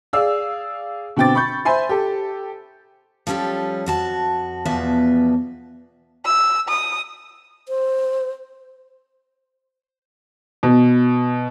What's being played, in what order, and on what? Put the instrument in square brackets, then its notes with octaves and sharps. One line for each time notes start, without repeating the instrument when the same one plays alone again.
[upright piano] G#4 D5 F5 E6
B2 D3 C4 G5 D6 A6
B5 C#6 G6
C5 E5 G#5 B5 C6
G4 A4
[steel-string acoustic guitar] F3 G3 C#4 G4 A4
F2 F#4 A5
E2 B2 F3 B4 E5 A5
[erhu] E6
D#6
[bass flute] C5
[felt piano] B2